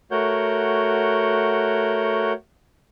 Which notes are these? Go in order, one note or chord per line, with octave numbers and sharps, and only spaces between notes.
A3 F#4 A#4 C#5 F#5 G6